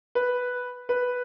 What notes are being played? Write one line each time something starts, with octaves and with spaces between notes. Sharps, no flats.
B4
B4